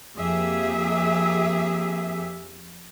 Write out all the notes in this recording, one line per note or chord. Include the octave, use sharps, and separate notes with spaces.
F2 A#3 G4 G#4 E5